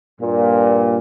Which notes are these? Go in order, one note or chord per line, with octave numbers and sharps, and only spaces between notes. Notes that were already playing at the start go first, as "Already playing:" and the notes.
G2 A#2